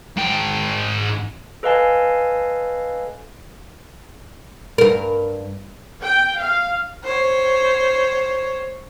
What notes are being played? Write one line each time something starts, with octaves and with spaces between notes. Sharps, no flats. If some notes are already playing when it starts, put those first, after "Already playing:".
G#2 G5
A4 B4 D#5 F5 G#5 A5
G2 A#4
G5
F5
C5 C#5